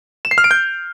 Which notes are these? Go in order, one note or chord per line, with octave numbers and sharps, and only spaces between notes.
E7
C7
F6
D7
G6